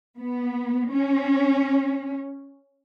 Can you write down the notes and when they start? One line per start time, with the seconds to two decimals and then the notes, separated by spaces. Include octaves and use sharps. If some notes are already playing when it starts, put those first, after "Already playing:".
0.18 B3
0.91 C#4